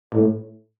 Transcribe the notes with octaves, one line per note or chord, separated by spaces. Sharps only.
A2